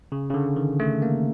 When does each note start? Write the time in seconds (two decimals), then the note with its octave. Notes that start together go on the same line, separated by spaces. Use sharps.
0.12 C#3
0.30 C#3
0.34 D3
0.56 D#3
0.80 A3
1.02 A#3